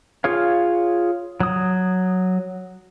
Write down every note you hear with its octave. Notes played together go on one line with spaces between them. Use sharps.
F4 G#4 C#5 F5
F#3 D#6